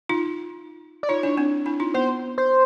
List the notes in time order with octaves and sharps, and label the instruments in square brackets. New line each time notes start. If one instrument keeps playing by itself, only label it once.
[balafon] D#4 F4
[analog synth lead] D5
[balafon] D#4 F4 [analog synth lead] C#5
[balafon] D4 E4
C4 D4
D4 E4
D#4 F4
[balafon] B3 [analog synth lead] C5
[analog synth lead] C5